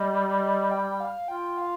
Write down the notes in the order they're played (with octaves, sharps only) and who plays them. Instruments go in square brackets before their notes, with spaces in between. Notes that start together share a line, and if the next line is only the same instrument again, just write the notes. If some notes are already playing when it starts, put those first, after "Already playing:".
Already playing: [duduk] G3 [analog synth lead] D#5
[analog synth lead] G5
F5
[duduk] F4 [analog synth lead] G5
[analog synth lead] F5